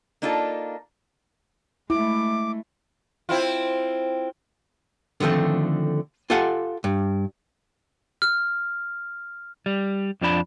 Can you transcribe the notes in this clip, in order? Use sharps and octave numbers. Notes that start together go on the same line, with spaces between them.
A#3 D4 D#4 F4 G4 A4
G#3 A3 E4 D6
C4 E4 F4
D3 D#3 F3 A3 C4
F4 G4 A4 F5 F#5 G#5
G2
F6
G3
F2 F3 D4 B5